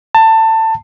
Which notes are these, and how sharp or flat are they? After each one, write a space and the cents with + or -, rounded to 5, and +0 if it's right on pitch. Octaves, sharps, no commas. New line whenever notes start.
A5 +20